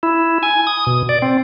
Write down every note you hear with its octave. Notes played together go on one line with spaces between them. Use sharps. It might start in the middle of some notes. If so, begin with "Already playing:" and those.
E4
G#5
D#6
B2
D5
C4